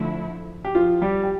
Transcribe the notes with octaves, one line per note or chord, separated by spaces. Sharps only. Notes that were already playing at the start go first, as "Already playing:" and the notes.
Already playing: D3 F3 A3 E4
G4
F3 F4
G3 G4
G4